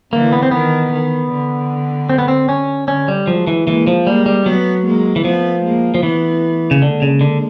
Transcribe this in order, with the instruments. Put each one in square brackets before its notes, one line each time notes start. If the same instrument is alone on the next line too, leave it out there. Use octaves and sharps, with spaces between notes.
[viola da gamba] D3 E3 [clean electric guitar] A#3
[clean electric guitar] B3
C4
[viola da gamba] D#3 [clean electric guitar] B3
[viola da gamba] D#3
D3
[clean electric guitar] C4
B3
C4
C#4
[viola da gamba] D3 [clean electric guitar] C#4
[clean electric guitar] G3
[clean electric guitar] F3 [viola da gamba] F#3 G#3
[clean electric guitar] E3
[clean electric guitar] E3 [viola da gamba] G#3 A#3
[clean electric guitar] F3
[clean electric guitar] G3 [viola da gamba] G#3 A#3
[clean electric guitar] G3
[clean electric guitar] F#3 [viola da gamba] A3 B3
[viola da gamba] G#3 A#3
[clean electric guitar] E3
[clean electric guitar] F3 [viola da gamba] A3 B3
[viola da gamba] G#3 A#3
[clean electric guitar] F3
[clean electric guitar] E3 [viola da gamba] A3 B3
[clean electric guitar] C#3
[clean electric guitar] D3 [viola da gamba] G#3 A#3
[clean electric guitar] C#3
D3